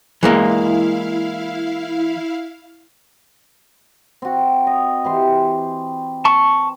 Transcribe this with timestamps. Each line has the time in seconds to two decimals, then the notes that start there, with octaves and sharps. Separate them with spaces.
0.23 E3 G#3 A#3 E4 F5
4.22 C4 F#4
4.67 D#5
5.04 E3 G4 C6
6.25 A5 C#6